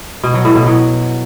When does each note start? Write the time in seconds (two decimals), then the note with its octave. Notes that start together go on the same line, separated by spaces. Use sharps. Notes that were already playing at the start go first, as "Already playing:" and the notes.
0.24 B2
0.34 F#3
0.45 A2
0.56 B2
0.66 F#3